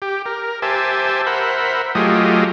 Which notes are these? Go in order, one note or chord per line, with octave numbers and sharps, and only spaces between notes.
G4
A#4
G4 C5 E5 G#5 A5
A#4 C5 E5 F#5 B5
F#3 A3 F4 G4 G#4 D#5